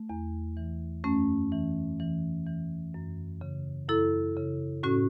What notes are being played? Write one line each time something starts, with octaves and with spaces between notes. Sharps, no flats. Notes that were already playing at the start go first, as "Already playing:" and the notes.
Already playing: A3
E2
E3
F#2 A3 C#4
E3
E3
E3
F#2
C#3
F#2 E4 A4
C#3
A2 C#4 F#4